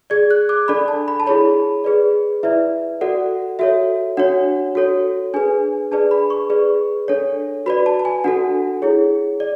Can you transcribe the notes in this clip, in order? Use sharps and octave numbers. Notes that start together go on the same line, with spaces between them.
G#4 D5 G#6
F#6
D6
D4 A4 D5 B5
A5
B5
A5
E4 G#4 C#5 B5
G#4 B4 D5
E4 B4 D5 E5
F#4 A4 D5 F#5
F#4 A4 C#5 E5
D4 F#4 C#5 F#5
F#4 A4 C#5
D4 G#4 B4 G#5
D4 G#4 B4 D5 A5
B5
C#6
G#4 B4 D5
D4 A4 C#5
F#4 B4 D5 B5
A5
A5
G#5
D4 F#4 A4 F#5
E4 G#4 C#5
D5